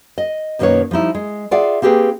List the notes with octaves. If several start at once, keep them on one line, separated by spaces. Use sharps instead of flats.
D#5
F#2 B2 D#3 A#3 B4 C#5
F3 G3 D#4 E4
G#3
F4 G#4 D5 E5 F#5
A#3 C4 G4 G#4 B4